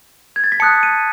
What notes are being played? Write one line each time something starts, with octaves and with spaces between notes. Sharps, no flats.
G#6
A6
B6
A5 D#6 F#6 C#7
D#7